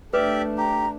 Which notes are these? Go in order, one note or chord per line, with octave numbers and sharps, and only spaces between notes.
A3 D4 G4 B4 D5 E5
G4 A#5